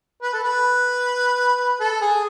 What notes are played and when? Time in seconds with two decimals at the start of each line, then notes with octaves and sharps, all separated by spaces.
0.22 B4
0.33 A4
0.44 B4
1.80 A4
2.01 G#4